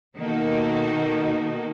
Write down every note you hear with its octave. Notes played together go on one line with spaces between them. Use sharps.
B2 D#3 A#3 D#4 F#4 A4